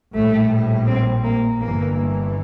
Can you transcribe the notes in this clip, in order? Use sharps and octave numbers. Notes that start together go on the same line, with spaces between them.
A#1 A2 G3 A3
C4
A#3
G1 G2 E3 A#3